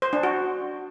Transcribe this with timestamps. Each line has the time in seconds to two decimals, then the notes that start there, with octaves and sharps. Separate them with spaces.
0.02 C5
0.13 D4
0.23 F#4